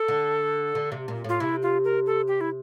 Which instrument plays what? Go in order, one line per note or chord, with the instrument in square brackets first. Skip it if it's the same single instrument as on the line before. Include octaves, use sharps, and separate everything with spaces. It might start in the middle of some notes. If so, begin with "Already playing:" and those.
Already playing: [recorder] A4
[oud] D3
D3
C3
A#2
[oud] A2 [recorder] F4
[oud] C3 [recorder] E4
[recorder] F4
A#4
A4
G4
E4